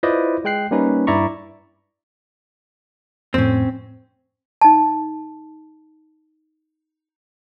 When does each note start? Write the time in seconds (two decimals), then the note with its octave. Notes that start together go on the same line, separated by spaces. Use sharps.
0.03 E4 F4 B4 C5 D5 D#5
0.45 G#3 G5 F#6 C7
0.71 G3 A#3 C#4 D#4 B4
1.07 G2 E4 D5 E5 A#5 C#6
3.34 F2 A2 C4 C#4
4.61 D#4 A5